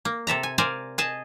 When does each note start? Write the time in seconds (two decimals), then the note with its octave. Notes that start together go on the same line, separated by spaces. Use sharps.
0.05 A#3
0.27 C3 A4 E5 A#5
0.43 G#5
0.58 A#4 C5 D5 F5 G#5 A#5
0.98 G#4 D#5 G#5 A5